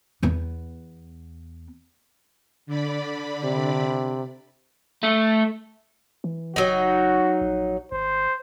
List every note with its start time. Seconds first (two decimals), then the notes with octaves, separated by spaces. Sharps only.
0.23 E2 B3
2.66 D3 D5 B5
3.44 C3
5.03 A3
6.24 E3
6.56 F#1 F#3 D#4 F#4
7.41 A#1
7.92 G#1 C5